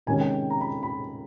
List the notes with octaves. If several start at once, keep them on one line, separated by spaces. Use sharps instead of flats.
C3 D#3 G#3 C#4 G#5
G5
A#5
B5
B5